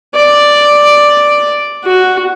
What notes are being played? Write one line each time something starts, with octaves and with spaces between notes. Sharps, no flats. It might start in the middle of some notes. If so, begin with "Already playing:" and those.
D5
F#4